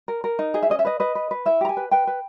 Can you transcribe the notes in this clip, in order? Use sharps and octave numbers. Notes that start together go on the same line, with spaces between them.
A#4
A#4
D#4
G#4 D#5
E5
C#4 D#5
E5
B4 D#5
B4 D#5
B4
B4
E4 E5
G4 A#5
G#5
B4
B4 G5
B4